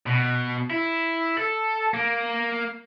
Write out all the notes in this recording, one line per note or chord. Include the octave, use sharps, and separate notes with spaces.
B2
E4
A4
A#3